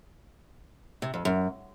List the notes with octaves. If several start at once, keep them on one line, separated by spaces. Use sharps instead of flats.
C3
F2
F#2